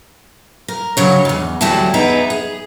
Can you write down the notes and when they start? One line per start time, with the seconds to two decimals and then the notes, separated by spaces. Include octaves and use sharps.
0.68 A#4
0.97 C#3 F#3 C#5
1.25 E2 G#2
1.61 D2 E3 F#3 G3 E4 A5
1.94 E2 B3 D#4 G#4 E5 A#5
2.30 G#4